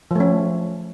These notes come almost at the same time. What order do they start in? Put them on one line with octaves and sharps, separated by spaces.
F3 A3 C#4